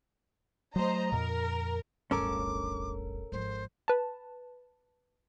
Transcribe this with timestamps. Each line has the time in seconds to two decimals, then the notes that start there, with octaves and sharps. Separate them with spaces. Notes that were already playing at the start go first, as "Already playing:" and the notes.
0.76 F#3 A3 C5 D#5 A#5
1.12 F2 A#2 A#4
2.11 D1 G1 C#4 A4 A#4 D6
3.32 G#1 F3 C5
3.88 B4 A5